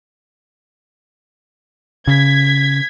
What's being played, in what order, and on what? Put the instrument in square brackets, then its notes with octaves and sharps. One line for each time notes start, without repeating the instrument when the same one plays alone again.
[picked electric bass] C#3 [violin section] G#6 B6